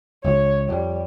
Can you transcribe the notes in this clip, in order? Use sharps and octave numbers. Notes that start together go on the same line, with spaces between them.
C#2 C#5
F2 G3